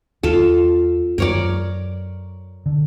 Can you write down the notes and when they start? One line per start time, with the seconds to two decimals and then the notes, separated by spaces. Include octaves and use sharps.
0.23 E2 C4 F4 A4
1.18 F#2 F#3 A#4 C#5 D5
2.66 D3